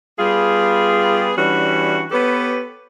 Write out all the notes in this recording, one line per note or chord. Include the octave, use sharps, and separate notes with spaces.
G3 B3 F4 G#4
E3 G3 C#4 D4 F#4
B3 G4 A4 B4 C#5